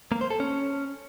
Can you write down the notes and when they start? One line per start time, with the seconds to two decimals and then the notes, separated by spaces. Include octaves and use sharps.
0.12 A#3
0.21 C5
0.30 A4
0.40 C#4